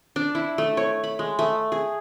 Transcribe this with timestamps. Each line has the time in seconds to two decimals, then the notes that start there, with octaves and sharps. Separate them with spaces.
0.16 D4
0.35 E4
0.58 A3
0.77 C#5
1.04 B5
1.19 G#3
1.39 A3
1.72 G#4